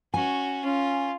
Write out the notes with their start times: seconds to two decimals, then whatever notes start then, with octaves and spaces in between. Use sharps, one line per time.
0.14 C#4 F#4 G#5
0.65 C#4 F4